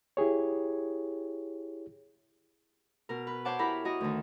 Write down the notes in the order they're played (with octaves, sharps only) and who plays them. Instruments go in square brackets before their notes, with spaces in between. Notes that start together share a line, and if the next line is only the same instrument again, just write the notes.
[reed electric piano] E4 G4 G#4 C#5
[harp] B2 A#4
B4
C5 C#5 F#5 A5 D6
E4 G4 A#4 B5
F#4 A#4 D#5
D2 D#3